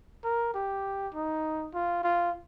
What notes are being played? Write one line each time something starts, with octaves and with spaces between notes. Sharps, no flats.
A#4
G4
D#4
F4
F4